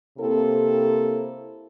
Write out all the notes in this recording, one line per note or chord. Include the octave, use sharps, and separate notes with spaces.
C3 A#3 C4 E4 A4